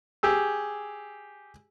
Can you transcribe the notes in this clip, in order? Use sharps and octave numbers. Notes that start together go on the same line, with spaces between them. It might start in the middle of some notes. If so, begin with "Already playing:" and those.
G4 G#4 E6